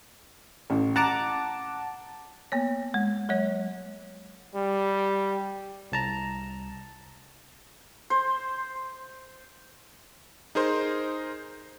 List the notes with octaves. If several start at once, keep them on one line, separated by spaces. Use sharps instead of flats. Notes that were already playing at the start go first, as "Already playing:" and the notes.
A1
F#5 A5 A#5 D6
A#3 B3 C#5
G#3
F#3 G#3 C#5
G3
C2 A5 A#5
C5
D#4 G#4 A#4 C5 C6